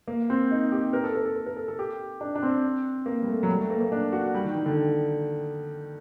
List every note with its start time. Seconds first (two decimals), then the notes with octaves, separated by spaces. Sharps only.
0.08 A#3
0.30 C4
0.51 D#4
0.72 G4
0.93 A#4
1.04 A4
1.15 A#4
1.25 A4
1.36 A4
1.46 A#4
1.57 A4
1.68 A4
1.79 G4
2.21 D4
2.36 D4
2.43 C4
3.06 A#3
3.22 G3
3.28 A3
3.43 F#3
3.49 G3
3.59 A3
3.70 A#3
3.80 A#3
3.92 D4
4.13 F#4
4.34 G3
4.45 D#3
4.55 D#3
4.66 D3